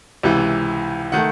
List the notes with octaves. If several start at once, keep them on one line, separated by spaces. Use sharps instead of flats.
C#2 C3 E3
D#3 A3 F#5